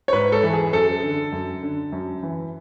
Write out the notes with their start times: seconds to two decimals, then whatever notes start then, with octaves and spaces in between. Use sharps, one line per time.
0.08 C#5
0.13 G#2 B4
0.32 A4
0.43 E3
0.53 G#4
0.73 F#2 A4
1.03 D3
1.32 F#2
1.63 D3
1.92 F#2
2.23 E3